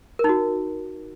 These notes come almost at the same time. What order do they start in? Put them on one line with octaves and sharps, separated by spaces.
A#4 D#4 F#4